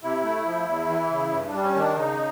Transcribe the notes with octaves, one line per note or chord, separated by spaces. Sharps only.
C3 E4
A3
F3
E2
E3
C#3
G2
D4
G3
C#4
D#3 D4
C#3 D#4